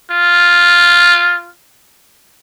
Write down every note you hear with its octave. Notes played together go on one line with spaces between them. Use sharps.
F4